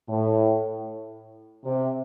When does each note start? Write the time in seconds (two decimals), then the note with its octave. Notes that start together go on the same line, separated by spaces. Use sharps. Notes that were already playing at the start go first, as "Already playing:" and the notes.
0.09 A2
1.65 C3